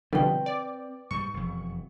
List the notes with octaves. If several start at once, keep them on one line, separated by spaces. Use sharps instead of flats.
B2 D3 F3 G3 C4 B4 G5
D5
G#2 G3 C#6
E1 F2